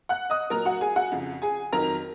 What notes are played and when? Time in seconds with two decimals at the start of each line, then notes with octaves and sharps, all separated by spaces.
0.09 F#5 F#6
0.30 D#5 D#6
0.50 A#2 F#3 A#4 A#5
0.65 F#4 F#5
0.81 G#4 G#5
0.96 F#4 F#5
1.12 F2 C#3 F3
1.42 G#4 G#5
1.73 F2 D#3 F#3 A#4 A#5